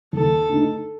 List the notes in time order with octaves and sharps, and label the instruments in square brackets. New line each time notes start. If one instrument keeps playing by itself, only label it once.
[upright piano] D#2 [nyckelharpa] A4
[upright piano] D3 A3 D#4